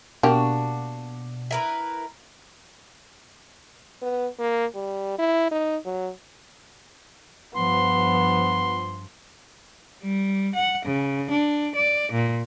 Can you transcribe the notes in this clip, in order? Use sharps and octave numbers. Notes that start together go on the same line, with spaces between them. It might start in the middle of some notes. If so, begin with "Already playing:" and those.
B2 A#3 D4 F#4 G4
E4 A#4 B4
B3
A#3
G3
E4
D#4
F#3
G2 F3 B3 C6
G3
F#5
C#3
D4
D5
A#2